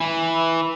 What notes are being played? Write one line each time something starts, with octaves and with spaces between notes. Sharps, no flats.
E3